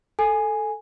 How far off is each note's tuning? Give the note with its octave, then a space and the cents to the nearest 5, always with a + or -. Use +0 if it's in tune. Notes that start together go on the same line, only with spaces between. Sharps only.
A4 -5 G#5 +0